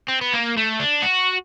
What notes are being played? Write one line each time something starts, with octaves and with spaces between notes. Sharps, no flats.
C4
B3
A#3
A3
D4
F#4